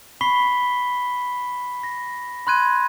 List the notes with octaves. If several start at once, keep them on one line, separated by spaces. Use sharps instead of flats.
B5 C#6 B6 C7 G7
A#6
B5 C6 F#6 G#6 D#7